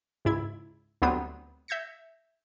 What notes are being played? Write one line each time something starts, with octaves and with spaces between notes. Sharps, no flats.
C#2 G#2 E4 G#6
D2 F#3 G3 B3 C4 D#6
E5 G6 G#6 A#6 C#7